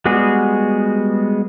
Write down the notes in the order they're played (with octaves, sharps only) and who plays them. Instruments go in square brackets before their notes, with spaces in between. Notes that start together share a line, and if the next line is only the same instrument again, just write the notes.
[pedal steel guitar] G3 G#3 B3 F#4 G#4